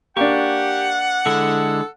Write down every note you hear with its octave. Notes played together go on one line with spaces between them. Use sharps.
A#3 D4 G4 F#5 C#6
D3 G#3 E4 A4